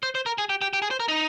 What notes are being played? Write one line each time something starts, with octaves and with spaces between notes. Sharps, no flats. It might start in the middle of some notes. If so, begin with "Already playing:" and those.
C5
C5
A#4
G#4
G4
G4
G4
G#4
C5
A#4
D#4